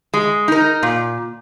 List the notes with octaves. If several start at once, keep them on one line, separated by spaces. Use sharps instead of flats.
G#3
D#4 A#4
A#2